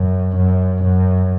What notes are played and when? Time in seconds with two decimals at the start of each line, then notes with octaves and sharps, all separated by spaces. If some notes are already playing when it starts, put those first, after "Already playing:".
Already playing: F#2
0.36 F#2
0.83 F#2